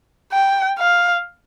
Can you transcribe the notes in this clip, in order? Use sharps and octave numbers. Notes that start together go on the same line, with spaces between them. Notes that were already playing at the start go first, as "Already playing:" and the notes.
G5
F5